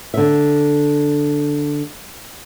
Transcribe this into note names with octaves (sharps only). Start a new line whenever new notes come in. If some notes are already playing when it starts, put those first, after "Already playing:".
D3 E5